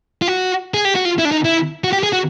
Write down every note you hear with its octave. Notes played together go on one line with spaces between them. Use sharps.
F4
F#4
G#4
G4
F#4
F4
E4
D4
D#4
E4
F#4
G4
G#4
F#4